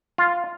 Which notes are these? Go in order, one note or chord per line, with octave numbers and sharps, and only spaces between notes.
F4